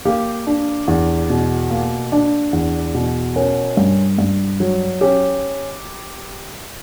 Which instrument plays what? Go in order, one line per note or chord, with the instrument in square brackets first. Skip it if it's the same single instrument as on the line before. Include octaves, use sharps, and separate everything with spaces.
[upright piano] A#3 G4
D4
E2
B2
A#3
D4
E2
B2
C#4 A#4
G2
G2
F#3
C#4 G4